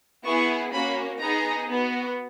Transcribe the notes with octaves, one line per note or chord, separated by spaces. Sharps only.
B3 E4 G#4 C#6
A#3 C#4 F#4 B5
B3 D#4 G#4 A#5
B3 F#4